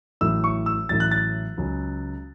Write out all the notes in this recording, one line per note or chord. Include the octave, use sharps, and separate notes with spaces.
A1 A2 F#3 E6
C#6
E6
A1 A2 F#3 A6
F#6
A6
C#2 C#3 F#3